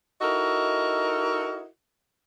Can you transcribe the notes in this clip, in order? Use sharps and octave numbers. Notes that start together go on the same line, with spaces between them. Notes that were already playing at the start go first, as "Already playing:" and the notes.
D#4 E4 F#4 A4 A#4 D#5